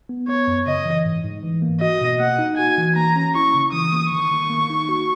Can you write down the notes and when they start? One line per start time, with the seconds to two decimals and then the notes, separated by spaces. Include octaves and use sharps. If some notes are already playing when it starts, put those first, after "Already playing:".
0.09 B3
0.28 B3 C#5
0.47 F#2
0.67 C#3 D#5
0.85 E3
1.05 G#2
1.24 G#2
1.43 E3
1.62 A#3
1.81 F#4 D#5
2.01 B2
2.20 A#3 F#5
2.39 D#4
2.58 F#4 G#5
2.78 E3
2.96 A#3 A#5
3.16 C#4
3.35 E4 C#6
3.54 C#3
3.73 E3 D#6
3.92 A#3
4.12 D#3 C#6
4.31 D#3
4.50 A#3
4.70 D#4
4.89 F#4